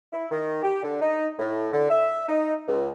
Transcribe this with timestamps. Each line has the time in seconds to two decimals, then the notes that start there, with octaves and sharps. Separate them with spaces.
0.13 E4
0.31 D#3
0.63 G4
0.83 D3
1.01 D#4
1.39 A2
1.72 D3
1.90 E5
2.28 D#4
2.68 C#2